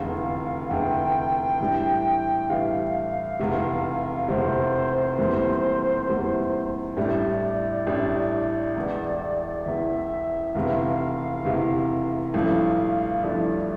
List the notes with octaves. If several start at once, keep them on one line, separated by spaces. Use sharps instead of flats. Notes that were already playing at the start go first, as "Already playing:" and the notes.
Already playing: F1 E2 D3 F5
F1 E2 D3 G5
A2 E3 G3 D4
A2 E3 G3 D4 F5
F1 E2 C3
F1 E2 C3 C5
F1 E2 E3 G3 A#3
F1 E2 E3 G3 A#3
A1 A2 G3 D4 D5
A1 A2 G3 D4
E1 E2 E3
E1 E2 E3 E5
F1 E2 C3 E3 F5
F1 E2 C3 E3
A1 G2 F3 A3 E4 F5
A1 G2 F3 A3 E4 D5